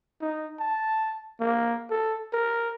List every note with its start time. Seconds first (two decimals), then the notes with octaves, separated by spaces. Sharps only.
0.21 D#4
0.60 A5
1.40 A#3
1.91 A4
2.33 A#4